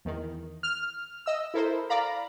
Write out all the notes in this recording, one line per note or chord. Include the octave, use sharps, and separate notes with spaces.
E2 D#3
F6
D#5 E6
E4 A4 A#4 C5
D5 F5 A#5 B5